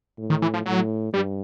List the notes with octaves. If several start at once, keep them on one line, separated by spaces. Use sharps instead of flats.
A2
D#3
E3
F3
A2 F#3
G2 G3